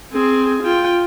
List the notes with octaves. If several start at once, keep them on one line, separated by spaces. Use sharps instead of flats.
C4 G#4
F4 G5